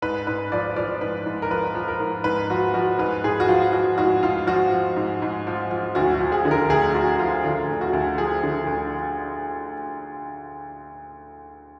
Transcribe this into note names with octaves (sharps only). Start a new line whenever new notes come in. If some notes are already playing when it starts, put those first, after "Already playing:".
G#2 B4
G#2 B4
F3 D5
F3 D5
G#2 B4
G#2
A#4
F3 B4
F3
A#4
G#2
G#2 B4
F3 F#4
F3 F#4
G#2 B4
G#2 G#4
F#4
F3 F4
F3 F#4
G#2 F#4
G#2 F4
F3 F#4
F3
G#2
G#2
F3
F3
D2 F#4
F#4
F3
G#4
D3
A#4
D2 G#4
D2 F#4
F3 F4
D3 F4
D2
F#4
D2
F3 G#4
D3
D2